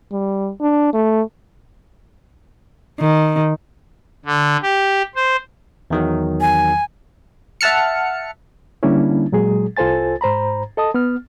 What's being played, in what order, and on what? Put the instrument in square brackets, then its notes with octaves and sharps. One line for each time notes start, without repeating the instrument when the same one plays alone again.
[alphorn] G3
D4
A3
[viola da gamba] D#3
[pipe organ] D3
G4
C5
[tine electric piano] E2 D#3 F#3
[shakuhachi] G#5
[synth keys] E5 F#5 A5 F6 C#7
[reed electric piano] D3 G3 A#3 C#4 D4 E4
A#2 F#3 G#3 G#4
C2 F4 A4 C5 G#5 A6
G#2 C5 A#5 B5
A4 D#5 A5 D#6
B3 F6